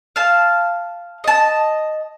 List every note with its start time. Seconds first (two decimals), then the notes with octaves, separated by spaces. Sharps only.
0.16 F5 A5
1.24 D#5 A5